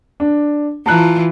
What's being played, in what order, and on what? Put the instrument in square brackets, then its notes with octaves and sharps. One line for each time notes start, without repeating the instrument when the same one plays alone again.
[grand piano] D4
[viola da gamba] E3 F4 [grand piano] A5 A#5 F#6